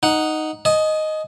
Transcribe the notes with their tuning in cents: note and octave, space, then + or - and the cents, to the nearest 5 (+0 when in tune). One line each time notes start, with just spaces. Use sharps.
D#4 +0 F#5 +0
D#5 +0 G#5 +45